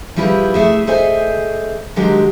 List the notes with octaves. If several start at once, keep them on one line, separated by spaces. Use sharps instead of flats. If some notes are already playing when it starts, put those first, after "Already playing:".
F3 G3 E4 G#4 A#4 B4
A3 G#4 E5
G#4 A4 C5 D#5 E5 G#5
D3 D#3 F#3 G#3 G4 A#4